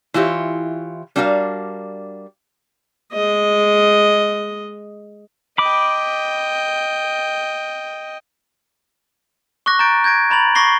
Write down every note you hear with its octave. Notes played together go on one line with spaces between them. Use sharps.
E3 E4 F4 G4 C#5
G3 D4 F#4 A#4 D#5 F5
G#3 D#5
D#5 G5 B5 D6
C#6 D6 F#6 A#6
A#5 G6 A6 D7
G6 G#6 A#6 D7
A#5 B5 A6 F#7
C#6 D6 A#6 C7 G7